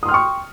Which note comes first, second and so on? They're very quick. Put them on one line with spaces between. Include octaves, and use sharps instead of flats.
D#6 C6 F6 G5 C#6